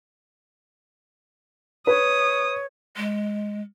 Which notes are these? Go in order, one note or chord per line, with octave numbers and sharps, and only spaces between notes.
B4 C#5 D#6
G#3